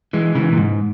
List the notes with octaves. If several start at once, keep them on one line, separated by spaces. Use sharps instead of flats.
E3 G#3
C#3 E3
A#2
G#2